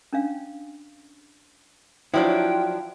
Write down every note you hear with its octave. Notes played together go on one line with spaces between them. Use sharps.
C#4 D4 F5
F3 F#3 D4 E4 C5 C#5 G5